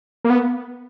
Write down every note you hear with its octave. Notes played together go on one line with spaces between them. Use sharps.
A#3
B3